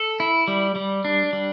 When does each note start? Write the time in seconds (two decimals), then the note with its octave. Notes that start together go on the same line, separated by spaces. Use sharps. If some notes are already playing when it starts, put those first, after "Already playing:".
Already playing: A4
0.20 E4
0.48 G3
0.75 G3
1.05 D4
1.33 G3